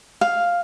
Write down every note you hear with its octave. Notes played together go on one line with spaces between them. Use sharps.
F5